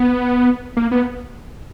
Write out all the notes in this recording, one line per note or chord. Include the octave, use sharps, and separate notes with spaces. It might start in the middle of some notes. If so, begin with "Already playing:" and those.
Already playing: B3
A#3
B3